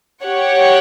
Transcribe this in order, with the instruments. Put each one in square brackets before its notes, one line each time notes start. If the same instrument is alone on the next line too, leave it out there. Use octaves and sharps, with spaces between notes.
[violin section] G4 C#5 F#5